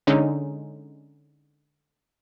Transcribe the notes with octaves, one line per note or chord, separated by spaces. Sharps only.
D3 G#3 C#4 D#4